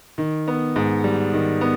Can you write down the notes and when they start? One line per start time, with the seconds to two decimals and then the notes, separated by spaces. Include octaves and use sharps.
0.18 D#3
0.48 B3
0.76 G#2
1.04 G3
1.33 D#3
1.61 B3